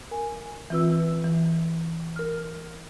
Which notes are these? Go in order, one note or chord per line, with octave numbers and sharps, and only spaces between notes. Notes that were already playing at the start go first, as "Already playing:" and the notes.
A#4 G#5
E3 C4 F4 B4 E6
E3
A#4 F6